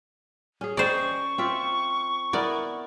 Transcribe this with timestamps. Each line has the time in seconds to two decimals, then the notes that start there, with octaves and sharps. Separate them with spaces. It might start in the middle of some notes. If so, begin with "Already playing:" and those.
0.61 C#4 G#4
0.77 C5 D5 D#5 G5 C#6
1.38 C4 F4 E5
2.33 B3 E4 A#4 D5